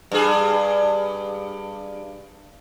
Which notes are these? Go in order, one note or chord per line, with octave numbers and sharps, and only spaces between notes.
G2 G#4